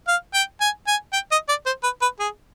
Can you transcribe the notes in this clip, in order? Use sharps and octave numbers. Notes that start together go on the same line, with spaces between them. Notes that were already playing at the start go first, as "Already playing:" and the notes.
F5
G5
G#5
G#5
G5
D#5
D5
C5
B4
B4
G#4